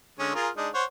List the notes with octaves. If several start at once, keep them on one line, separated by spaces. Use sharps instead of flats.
D3 G#3 C#4
F4 G#4 A#4
G#3 D4 D#4
C5 C#5 F#5